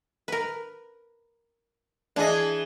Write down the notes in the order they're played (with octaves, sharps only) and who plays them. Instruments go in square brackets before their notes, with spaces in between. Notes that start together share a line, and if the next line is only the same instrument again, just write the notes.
[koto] A#4 B4
[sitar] E3 G#4 [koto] D4 D#5